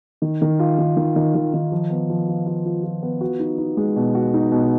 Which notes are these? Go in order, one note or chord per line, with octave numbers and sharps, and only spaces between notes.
D#3
D#3
F4
D#3
D#3
D#3
D#3
D#3
F3
B3
F3
F4
F4
F4
F4
B3
F#4
D#4
D#4
G#3
B2
F#4
D#4
B2